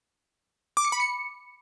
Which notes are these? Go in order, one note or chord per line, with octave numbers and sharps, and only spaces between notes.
D6
C#7
B5
C#7